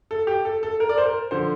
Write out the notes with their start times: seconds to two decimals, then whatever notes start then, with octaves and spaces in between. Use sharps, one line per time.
0.11 A4
0.27 G4
0.45 A4
0.63 A4
0.80 A#4
0.89 D5
0.98 C5
1.06 A#4
1.31 D3 F3 C5